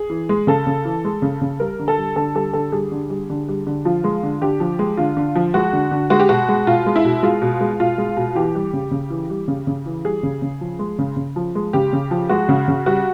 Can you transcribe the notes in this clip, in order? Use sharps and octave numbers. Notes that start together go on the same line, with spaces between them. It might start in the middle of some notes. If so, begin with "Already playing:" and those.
Already playing: G#4
E3
G#3
C#3 A4
C#3
E3
G#3
C#3
C#3
G3 A#4
D3
A4
G3
D3 A4
G3 A4
D3 A4
G3 G#4
D3
G3
D3
G3
D3
F3 F4
G#3
D3
D3 G4
F3
G#3
D3 F4
D3
F3
G#3 F#4
D3
D3
G#3 F#4
G4
B2 F#4
G#3
B2 F4
G#3
E4
B2
G#3 F4
B2
G#3
B2 F4
G#3
B2
E3 G4
G3
C#3
C#3
E3
G3
C#3
C#3
E3
G3 G#4
C#3
C#3
F3
G#3
C#3
C#3
F3
G#3
C#3 G4
C#3
F3
G#3 F#4
C#3
C#3
G3 F#4